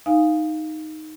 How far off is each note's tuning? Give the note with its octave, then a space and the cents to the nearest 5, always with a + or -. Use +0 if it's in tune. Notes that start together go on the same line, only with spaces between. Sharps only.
D#4 +0 F5 +0 G#5 -5